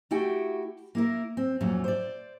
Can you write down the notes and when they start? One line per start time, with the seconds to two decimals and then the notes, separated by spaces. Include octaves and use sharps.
0.11 A3 E4 F#4 G4 G5
0.95 A#3 E4 A#4
1.37 C4
1.61 F2 A#2 F#3 A3 C#4
1.84 C5 D5